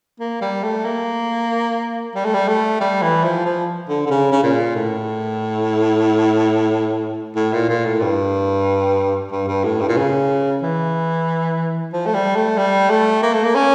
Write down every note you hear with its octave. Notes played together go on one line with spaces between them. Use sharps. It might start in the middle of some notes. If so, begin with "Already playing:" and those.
A#3
G3
A3
A#3
G3
A3
G3
A3
G3
E3
F3
F3
D3
D3
C#3
C#3
A#2
A2
A2
A#2
A#2
A2
G2
G2
G2
A2
G2
A#2
C#3
E3
F3
A3
G3
A3
G3
A3
A#3
A3
A#3
C#4